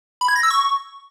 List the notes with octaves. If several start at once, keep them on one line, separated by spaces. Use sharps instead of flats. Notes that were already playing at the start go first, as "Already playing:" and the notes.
B5
G#6
A#6
E6
C#6